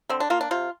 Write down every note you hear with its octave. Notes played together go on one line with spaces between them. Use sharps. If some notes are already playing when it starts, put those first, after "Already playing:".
D3 C4
D4
A#3 F4
D4
C3 F4